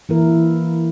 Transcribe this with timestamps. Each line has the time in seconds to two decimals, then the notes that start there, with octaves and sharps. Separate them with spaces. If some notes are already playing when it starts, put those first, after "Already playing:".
0.09 E3 A#3 E4 A#4